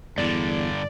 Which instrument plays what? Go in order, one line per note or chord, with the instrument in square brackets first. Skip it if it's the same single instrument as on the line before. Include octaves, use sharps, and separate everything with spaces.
[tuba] E2 [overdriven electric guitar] G2 D3 [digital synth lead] D5